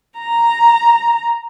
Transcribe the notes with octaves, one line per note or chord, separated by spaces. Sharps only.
A#5